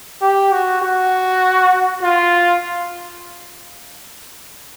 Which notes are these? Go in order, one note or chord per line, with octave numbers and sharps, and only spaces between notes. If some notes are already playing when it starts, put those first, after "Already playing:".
G4
F#4
F#4
F4